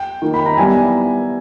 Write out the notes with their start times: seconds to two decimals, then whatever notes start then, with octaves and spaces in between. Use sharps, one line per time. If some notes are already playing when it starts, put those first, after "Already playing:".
Already playing: G5
0.22 D#3 A#3 D#4
0.34 B5
0.46 A#5
0.57 G3 B3 E4 G#5